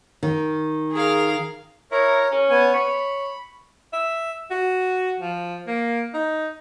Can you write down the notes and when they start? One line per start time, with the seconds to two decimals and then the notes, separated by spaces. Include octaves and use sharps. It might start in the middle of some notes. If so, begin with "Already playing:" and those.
0.23 D#3
0.92 G#4 A#4 F5
1.92 E4 A#4 C#5 A#5
2.32 C#4
2.50 B3 C#5 G#5
2.74 C#5 B5
3.93 E5
4.51 F#4
5.20 F3
5.67 A#3
6.14 D#4